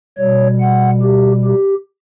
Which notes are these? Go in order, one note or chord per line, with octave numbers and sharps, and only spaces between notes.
B2 G3 C#5
F#5
G4
G4